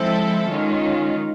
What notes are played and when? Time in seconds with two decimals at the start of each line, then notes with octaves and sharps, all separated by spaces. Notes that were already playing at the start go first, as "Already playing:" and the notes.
Already playing: F3 G#3 C4 E4 A4
0.48 D#3 G#3 C#4 F4